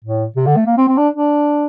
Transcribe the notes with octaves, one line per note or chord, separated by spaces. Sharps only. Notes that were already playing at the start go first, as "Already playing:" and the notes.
A2
C3
D3
A3
A#3
C4
C4
D4
D4